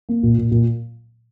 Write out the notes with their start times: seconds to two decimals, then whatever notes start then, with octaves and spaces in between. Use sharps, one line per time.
0.09 A#3
0.23 A#2
0.38 A#2
0.51 A#2